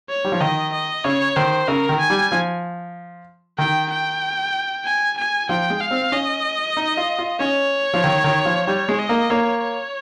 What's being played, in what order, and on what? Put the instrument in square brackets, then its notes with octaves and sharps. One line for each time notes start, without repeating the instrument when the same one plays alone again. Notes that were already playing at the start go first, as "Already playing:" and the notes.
[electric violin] C#5
[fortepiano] G3
F3
[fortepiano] D#3 [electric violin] D#5
[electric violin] D#5
[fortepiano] C#3 [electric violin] C#5
[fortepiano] D#3 [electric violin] C5
[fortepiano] C#3 [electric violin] A#4
[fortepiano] D#3
[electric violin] G#5
[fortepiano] G3
F3
[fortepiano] D#3 [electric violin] G5
[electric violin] G5
G#5
G#5
[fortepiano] F3 [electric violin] G5
[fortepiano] G#3
[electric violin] F5
[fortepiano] C4
[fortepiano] C#4 [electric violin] D#5
[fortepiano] D#4
F4
F4
[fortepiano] C#4 [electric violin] C#5
[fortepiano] F3
D#3
D#3
F3
[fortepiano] G3 [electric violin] C#5
[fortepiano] G#3
[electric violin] D#5
[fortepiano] A#3
[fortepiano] A#3 [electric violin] C#5
[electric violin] C#5